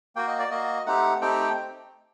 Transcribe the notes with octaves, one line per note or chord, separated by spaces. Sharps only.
A#3 F#4 G5
D#5
D5
A#3 F#4 D#5
A3 C4 D#4 G4 F#5
A3 C4 D#4 G4 G5